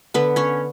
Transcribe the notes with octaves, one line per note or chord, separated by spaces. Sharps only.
D3 B3 B4
C#4 C#5